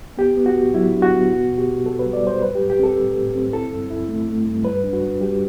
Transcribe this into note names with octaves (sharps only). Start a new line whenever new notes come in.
B3 G4
B3
F#4
A2
F#3 E4
D4
F#4
B3
B2 F#4
B2
G4
B2
B2 A4
B4
G3
D5
G3 C5
A2 B4
G4
A2
G4
C4 A4
A2
A2
C4
E4 A4
G2
E4
A3
A3
G2
G3 B4
D4
F#4
D4
G3 G4